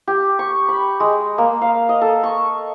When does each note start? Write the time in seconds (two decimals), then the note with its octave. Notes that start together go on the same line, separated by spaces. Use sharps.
0.08 G4
0.39 C#6
0.68 B5
1.00 G#3
1.38 A#3
1.62 F5
1.89 D#5
2.01 A4
2.23 C#6